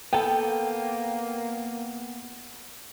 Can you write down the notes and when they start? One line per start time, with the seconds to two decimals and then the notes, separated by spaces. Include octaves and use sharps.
0.13 A#3 B3 A4 G5